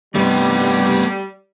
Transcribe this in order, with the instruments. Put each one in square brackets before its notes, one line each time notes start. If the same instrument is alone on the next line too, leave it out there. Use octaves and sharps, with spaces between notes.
[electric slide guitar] G2 C3 D#4 [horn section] G3 [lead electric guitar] A3 B3